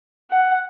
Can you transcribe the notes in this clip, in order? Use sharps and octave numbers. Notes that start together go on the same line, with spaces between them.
F#5